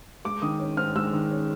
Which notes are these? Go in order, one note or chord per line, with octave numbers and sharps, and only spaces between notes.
G#3 D6
D#3 D#6
C#4
G#2 F6
G#3 E6
D#3
C#4